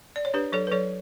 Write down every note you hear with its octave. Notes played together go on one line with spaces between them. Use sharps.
D5
C#5
D4 G4 B4
F#3 A4 C#5
B4
F#3 A4 C#5